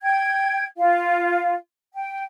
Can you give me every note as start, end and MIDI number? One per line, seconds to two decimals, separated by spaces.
0.01 0.65 79
0.01 0.65 92
0.78 1.54 65
0.78 1.54 77
1.95 2.22 79